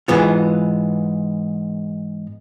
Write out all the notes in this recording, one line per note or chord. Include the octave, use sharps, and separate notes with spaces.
G#2 E3 B3 F4